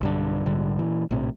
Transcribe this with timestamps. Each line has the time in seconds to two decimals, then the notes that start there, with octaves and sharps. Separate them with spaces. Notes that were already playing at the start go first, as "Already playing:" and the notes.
0.01 B1 G2 D3
0.46 A#1 G#2 D3 G3
0.79 A#2 E3
1.11 A#1 A2 C3